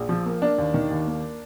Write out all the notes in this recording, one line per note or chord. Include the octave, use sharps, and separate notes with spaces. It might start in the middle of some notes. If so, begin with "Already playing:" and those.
Already playing: A#1
F3
A#3
A#3 D4
D#2
D#3
D#2
A#3